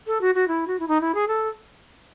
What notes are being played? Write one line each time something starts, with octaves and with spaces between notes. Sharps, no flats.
A4
F#4
F#4
E4
F#4
E4
D#4
E4
G#4
A4